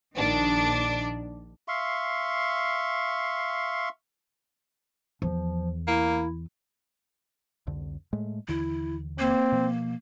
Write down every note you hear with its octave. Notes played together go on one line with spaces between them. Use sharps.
A#1 D#3 D4
E5 F5 C6 C#6
E2 F3
A#3 E4
C2 F2 D3
A2 G#3 A3
D#2 D3 E3 E4
A#3 C4
B2 F3